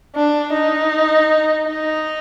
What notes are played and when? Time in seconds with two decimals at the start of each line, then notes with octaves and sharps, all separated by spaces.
0.16 D4
0.53 D#4
1.68 D#4